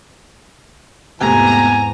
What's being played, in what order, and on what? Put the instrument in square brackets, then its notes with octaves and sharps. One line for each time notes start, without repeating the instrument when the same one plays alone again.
[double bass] E2 G#2 [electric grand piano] C3 A3 B3 [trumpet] G#5 [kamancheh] A#5